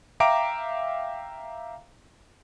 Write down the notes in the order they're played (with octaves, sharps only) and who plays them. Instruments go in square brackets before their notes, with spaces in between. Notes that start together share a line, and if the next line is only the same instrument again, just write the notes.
[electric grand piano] E5 F5 G5 A#5 D6 D7